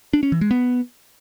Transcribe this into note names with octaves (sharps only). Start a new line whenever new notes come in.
D4
C#4
E3
G#3
B3